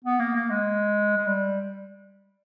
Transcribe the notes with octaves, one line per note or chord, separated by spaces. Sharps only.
B3
A#3
A#3
G#3
G#3
G3